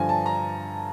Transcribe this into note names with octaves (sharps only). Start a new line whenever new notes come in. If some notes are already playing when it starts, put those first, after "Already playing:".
Already playing: G2 D3 F3 G#5
A5
A#5